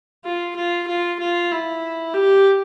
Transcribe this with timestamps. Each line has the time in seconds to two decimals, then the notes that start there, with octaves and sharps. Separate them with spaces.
0.25 F4
0.56 F4
0.87 F4
1.20 F4
1.51 E4
2.14 G4